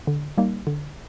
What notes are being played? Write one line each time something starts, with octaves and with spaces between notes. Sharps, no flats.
D3
G3 A#3 D#4
D3